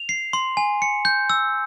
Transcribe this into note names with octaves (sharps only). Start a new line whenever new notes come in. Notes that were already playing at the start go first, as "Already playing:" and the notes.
Already playing: F7
C7
C6
G#5
C#7
G6
E6